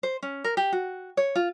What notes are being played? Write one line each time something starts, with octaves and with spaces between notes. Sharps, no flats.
C5
C#4
A#4
G4
F#4
C#5
F4